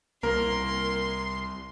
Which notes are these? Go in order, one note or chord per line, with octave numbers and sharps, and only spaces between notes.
C2 A#3 A#4 C6